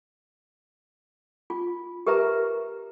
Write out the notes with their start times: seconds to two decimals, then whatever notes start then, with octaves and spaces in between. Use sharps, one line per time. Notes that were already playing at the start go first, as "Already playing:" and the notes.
1.50 F4
2.07 G4 A#4 B4 E5 A#5